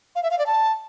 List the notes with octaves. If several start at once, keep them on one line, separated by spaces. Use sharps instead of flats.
F5
E5
F5
D5
A5